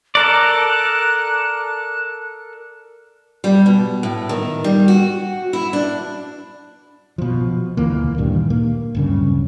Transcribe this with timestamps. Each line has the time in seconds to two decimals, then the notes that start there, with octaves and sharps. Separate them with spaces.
0.15 A4 A#4 D5 F#6
3.44 G3
3.66 B2
4.03 A2
4.29 D#3
4.64 G3
4.88 F#4
5.53 E4
5.73 D4
7.18 B2 F3
7.77 D2 E3 A#3
8.18 G2 A#2 D#3
8.50 A#3
8.95 D1 G2 C#3